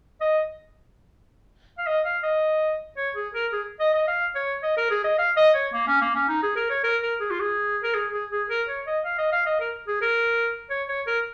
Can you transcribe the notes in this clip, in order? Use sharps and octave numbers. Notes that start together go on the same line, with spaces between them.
D#5
F5
D#5
F5
D#5
C#5
G#4
A#4
G#4
D#5
D#5
F5
C#5
D#5
A#4
G#4
D#5
F5
D#5
C#5
A#3
C#4
A#3
C#4
D#4
G#4
A#4
C#5
A#4
A#4
G#4
F4
G#4
A#4
G#4
G#4
G#4
A#4
C#5
D#5
F5
D#5
F5
D#5
A#4
G#4
A#4
C#5
C#5
A#4